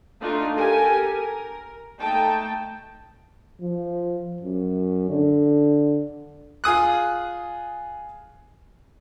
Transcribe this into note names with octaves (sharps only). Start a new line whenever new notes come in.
A3 D4 D#4 F4 F5
G4 A4 A#4 G#5
A#4
A3 D#4 G5 A5
F3
F#2
D3
F4 G#4 D#6 F#6